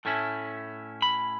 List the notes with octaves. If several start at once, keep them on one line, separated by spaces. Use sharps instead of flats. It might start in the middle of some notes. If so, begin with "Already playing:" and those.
A2 A3 C#4 E4
B5